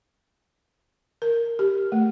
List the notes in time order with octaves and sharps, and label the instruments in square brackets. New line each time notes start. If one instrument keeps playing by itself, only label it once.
[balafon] A#4
G4
A3